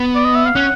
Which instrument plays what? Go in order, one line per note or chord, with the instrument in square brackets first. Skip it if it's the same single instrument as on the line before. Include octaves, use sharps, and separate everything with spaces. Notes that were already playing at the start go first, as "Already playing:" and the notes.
Already playing: [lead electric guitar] B3
[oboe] D5
D#5
E5
F5
[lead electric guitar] C#4 [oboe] F#5